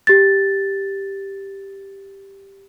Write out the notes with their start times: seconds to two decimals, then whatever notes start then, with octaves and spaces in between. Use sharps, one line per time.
0.07 G4 A6